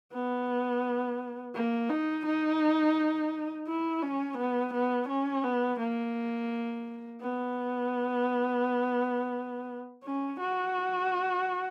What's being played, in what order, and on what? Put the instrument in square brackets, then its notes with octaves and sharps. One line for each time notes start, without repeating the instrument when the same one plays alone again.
[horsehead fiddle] B3
A#3
D#4
D#4
E4
C#4
B3
B3
C#4
B3
A#3
B3
C#4
F#4